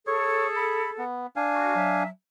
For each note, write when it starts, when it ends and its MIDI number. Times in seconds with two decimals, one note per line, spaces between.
0.07 1.05 68
0.07 1.05 69
0.07 0.47 73
0.56 0.90 83
0.98 1.27 59
1.36 2.03 62
1.36 2.03 77
1.36 2.03 80
1.55 1.74 66
1.76 2.09 54
1.76 2.09 76